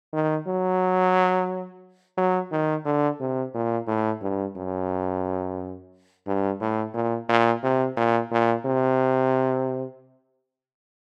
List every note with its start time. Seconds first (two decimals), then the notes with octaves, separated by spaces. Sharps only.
0.13 D#3
0.47 F#3
2.17 F#3
2.52 D#3
2.85 D3
3.20 C3
3.54 A#2
3.87 A2
4.22 G2
4.56 F#2
6.27 G2
6.61 A2
6.94 A#2
7.29 A#2
7.63 C3
7.97 A#2
8.32 A#2
8.65 C3